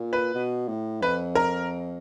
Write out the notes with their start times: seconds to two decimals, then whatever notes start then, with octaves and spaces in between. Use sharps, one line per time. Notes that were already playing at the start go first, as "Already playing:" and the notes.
Already playing: A#2
0.13 B4
0.35 B2
0.68 A2
1.02 F2 B4
1.35 A#4